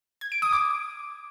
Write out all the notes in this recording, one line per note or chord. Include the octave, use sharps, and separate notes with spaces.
G#6
D7
D#6
D6